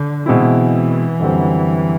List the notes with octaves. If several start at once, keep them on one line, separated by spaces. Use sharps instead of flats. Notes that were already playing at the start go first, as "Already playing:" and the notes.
Already playing: D3
B2 E3 G#3 C4 E4
F#2 D3 G3 C4